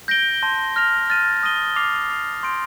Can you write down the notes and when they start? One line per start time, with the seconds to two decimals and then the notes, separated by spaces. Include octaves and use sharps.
0.08 G6 A#6 D7 G7
0.42 A5 C6 G6 A#6
0.76 F6 A#6 F7
1.10 F6 A6 D#7
1.43 D#6 A#6 D#7 G7
1.76 D6 F6 C7 F7
2.09 D6 F6 C7 F7
2.43 C6 G6 A#6 D7